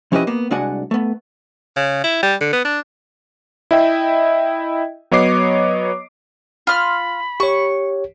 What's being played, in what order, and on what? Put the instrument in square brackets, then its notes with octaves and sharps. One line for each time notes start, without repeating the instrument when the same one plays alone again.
[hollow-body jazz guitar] F3 C#4 E4 G4 B4 D#5
A#3 B3
C2 G#3 D4 F#4 F#5 G#5
A3 B3
[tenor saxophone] C#3
E4
G3
D3
B3
D4
[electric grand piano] E4 D#5 E5 G5
F#3 B3 C#5 D#5 D6 C7
[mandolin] F4 F6 [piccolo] B5
[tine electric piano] G4 C#5 [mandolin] C#6